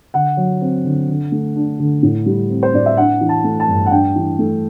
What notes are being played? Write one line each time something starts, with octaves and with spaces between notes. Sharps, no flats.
D3 F#5
F#3
C4
D3
D3
A3
D4
D3
A2
G3
C4
C5
A2 D5
E5
D4 F#5
E3
A5
A3
A5
G2
F#5
D4 G5
E3
A3